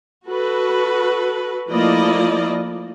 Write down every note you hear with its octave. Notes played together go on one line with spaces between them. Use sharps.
F#4 A4 B4
F3 A3 A#3 E4 D5 D#5